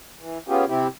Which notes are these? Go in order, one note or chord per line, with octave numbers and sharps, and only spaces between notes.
E3
B3 C#4 F4 G4 G#4
C3 C4 E4 G4